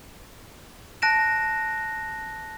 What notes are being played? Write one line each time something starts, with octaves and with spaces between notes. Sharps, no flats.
A5 F#6 A#6 D7 E7